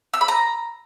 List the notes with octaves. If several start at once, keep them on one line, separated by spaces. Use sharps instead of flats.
E6
B5
A#5